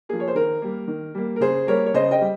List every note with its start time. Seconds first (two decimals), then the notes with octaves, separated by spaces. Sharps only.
0.09 F3 A#3 G#4
0.20 C#5
0.28 C5
0.35 D#3 A#4
0.62 G3 A#3
0.88 D#3
1.15 G3 A#3
1.36 A#4
1.41 C#3 G#4 C5
1.67 G3 A#3 A#4 C#5
1.86 C#5
1.94 C#3 C5 D#5
2.11 D#5 G5
2.21 G3